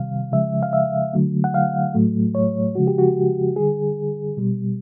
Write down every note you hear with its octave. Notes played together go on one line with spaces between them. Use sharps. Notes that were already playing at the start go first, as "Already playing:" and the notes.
Already playing: C3 D#3 G3 F5
C#3 F3 G#3 E5
F5
E5
D3 F#3 A3
F#5
F5
A2 F#3 A3
C#5
C#3 F3 G#3 F#4
G4
F#4
D3 G3 G#4
B2 G3